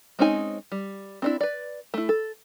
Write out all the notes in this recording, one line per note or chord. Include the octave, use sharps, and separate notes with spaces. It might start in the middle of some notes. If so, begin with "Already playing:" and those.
G#3 C4 C#4 D#4 G#5
G3
C4 D4 E4
B4 D5
A3 E4
A4